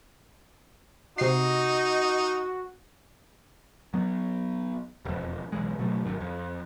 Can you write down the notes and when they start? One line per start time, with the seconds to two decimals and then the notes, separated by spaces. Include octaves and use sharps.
1.18 C3 D#4 F#4 D#5 C7
3.94 F#3 B3
5.05 E1 F2
5.52 B1 E3 G#3
5.78 F#1 B2 F#3 A3
6.04 G#1 F#2 A2 D#3
6.20 F2